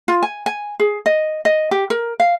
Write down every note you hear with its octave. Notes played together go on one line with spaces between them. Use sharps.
F4
G#5
G#5
G#4
D#5
D#5
G4
A#4
F5